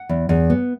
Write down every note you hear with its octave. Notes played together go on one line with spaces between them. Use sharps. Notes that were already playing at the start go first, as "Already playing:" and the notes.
Already playing: F#5
E2
E2
B3